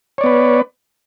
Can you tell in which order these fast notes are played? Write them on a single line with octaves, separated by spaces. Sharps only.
C#5 D5 B3 B4